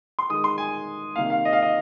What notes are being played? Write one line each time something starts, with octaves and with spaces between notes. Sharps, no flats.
C6
D#3 G#3 D#6
C6
G#5
C3 D#3 A#3 F5
F5
D#5
F5
D#5